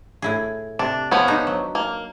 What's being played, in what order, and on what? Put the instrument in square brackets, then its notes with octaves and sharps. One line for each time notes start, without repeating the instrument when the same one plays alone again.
[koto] A2 E4 G#4
[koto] C3 [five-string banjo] D4
[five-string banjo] F3 B3 C#4
[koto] D4 D#4 A#5
F#3
[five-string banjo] A#3